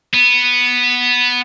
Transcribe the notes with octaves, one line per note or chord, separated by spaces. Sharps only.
B3